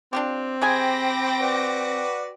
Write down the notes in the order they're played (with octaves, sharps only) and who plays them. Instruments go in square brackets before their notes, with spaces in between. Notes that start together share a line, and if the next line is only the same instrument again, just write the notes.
[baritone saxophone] C4 [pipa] D4 F4 G4
[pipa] C3 G#4 G#5 [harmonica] C5 B5 [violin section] G5 D6 A#6
[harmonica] F#4 B4 D5